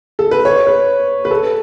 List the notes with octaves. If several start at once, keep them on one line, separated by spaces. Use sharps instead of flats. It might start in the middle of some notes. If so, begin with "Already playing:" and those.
A4
B4
C#5
B4
B4
A4